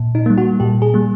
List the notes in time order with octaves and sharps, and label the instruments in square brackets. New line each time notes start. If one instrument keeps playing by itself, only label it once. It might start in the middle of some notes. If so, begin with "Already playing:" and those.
Already playing: [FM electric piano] A#2
D#4
G3 A#3
F#4
A#2 G4
G#4
G3 A#3